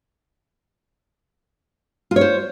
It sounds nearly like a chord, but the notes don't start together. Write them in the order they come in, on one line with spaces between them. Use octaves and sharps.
F4 C#5 C5